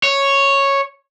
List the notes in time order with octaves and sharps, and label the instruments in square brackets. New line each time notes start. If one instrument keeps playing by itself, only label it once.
[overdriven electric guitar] C#5